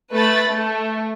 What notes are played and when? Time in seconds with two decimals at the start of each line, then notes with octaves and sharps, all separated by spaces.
0.11 A3 B4 B5 A6
0.48 A3